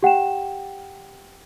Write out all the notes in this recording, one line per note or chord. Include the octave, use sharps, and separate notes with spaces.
G4 F#5 G5 E7